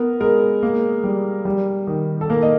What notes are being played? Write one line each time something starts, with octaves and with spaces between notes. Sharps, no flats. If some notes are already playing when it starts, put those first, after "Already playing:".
Already playing: B3 A#4
G#3 A#4
A#3
G3
G3
D#3
A4
A#3 A#4
D#5